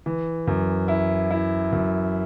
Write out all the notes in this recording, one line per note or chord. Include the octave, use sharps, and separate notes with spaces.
E3
F#2
E4
E4
F#2